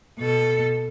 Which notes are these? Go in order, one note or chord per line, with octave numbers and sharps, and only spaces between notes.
B2 A4